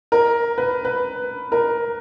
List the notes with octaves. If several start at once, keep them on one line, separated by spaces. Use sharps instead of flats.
A#4
B4
B4
A#4